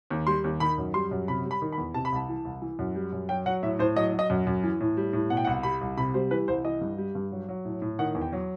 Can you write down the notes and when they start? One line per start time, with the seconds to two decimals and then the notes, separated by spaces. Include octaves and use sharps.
0.11 D#2
0.27 G3 C6
0.44 D#2
0.60 D#3 B5
0.78 F#2
0.94 G3 C6
1.11 F#2
1.28 C3 B5
1.45 G3
1.51 B5
1.62 D#3
1.72 B5
1.78 E2
1.94 C3 A5
2.05 B5
2.12 C2 A5
2.29 E3
2.45 C2
2.62 E3
2.79 F#2
2.95 G3
3.13 F#2
3.29 F#3 G5
3.46 F#3 F#5
3.63 A2 E5
3.79 A2 C5
3.96 F#3 D#5
4.12 F#3
4.19 D#5
4.30 F#2
4.47 F#2
4.63 E3
4.80 A2
4.97 G3
5.13 A2
5.30 B2 F#5
5.37 G5
5.45 C2 F#5
5.63 G3 B5
5.81 C2
5.97 C3 B5
6.14 G3 C5
6.31 E3 B4
6.48 C2 C5
6.65 E3 D#5
6.81 G2
6.98 G3
7.15 G2
7.32 F#3
7.49 F#3
7.65 A2
7.82 A2
7.99 D#3 F#5
8.15 E2
8.21 G5
8.32 F#3